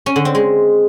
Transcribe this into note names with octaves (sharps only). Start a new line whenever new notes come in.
C#4
D3
C4
G#3